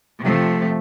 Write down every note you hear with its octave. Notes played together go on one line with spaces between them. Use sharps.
C3 F3 A3